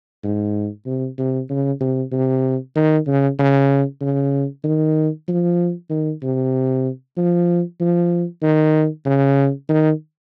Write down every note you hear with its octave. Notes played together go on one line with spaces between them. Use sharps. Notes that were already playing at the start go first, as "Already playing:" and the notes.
G#2
C3
C3
C#3
C3
C3
D#3
C#3
C#3
C#3
D#3
F3
D#3
C3
F3
F3
D#3
C#3
D#3